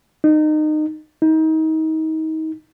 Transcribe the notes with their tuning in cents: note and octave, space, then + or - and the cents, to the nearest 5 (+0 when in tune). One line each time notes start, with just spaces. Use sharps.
D#4 -25
D#4 +30